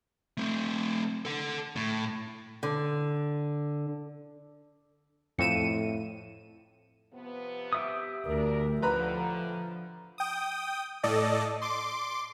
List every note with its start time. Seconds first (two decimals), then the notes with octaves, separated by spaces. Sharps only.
0.38 A3 C4
1.25 A4 F#5
1.76 A2
2.63 D3
5.39 F2 A2 C#7 D#7 E7
7.13 C3 F3 B3
7.73 G4 E5 D#6
8.26 D2 D4 A#4
8.82 A2 D3 F3 B4 A#5 B5
10.18 G5 D#6
11.03 A2 A4 D5 D#5
11.62 C6 D6